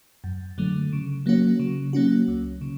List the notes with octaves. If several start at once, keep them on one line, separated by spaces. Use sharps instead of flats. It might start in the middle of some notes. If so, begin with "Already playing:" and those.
F#2
D3 F#3 A3
C#3
F#3 A#3 C#4 F#4
C#3
F#3 A#3 C#4 F#4
C#2
C#3